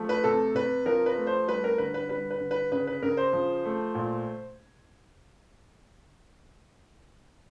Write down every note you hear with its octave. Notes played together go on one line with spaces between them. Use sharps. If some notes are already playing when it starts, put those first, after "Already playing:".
Already playing: F3 A3
B4
C3 A4
C3 B4
F3 A#4
B4
A3
C5
G3 B4
A#4
D3 B4
B4
G3 B4
B4
D3
B4
C#3 B4
B4
C#3 A#4
C5
F3
A3
A#2